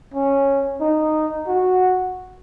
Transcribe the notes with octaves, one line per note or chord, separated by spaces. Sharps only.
C#4
D#4
F#4